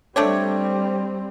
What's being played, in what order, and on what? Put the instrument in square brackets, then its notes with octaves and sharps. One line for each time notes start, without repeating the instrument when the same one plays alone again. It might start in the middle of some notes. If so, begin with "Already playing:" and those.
[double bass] G3 C4 [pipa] A3 D4 C#5